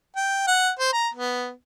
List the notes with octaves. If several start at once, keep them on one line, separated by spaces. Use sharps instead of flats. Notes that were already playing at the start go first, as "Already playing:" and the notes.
G5
F#5
C5
A#5
B3